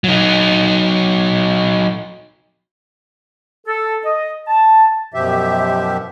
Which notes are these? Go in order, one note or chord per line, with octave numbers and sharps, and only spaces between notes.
F#3 D#4
A4
D#5
A5
F#2 B2 F3 G4 E5